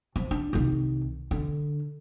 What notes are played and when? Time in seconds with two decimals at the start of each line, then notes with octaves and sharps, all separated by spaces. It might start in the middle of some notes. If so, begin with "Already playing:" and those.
0.16 F3
0.31 D4
0.53 C2 D#3
1.31 D3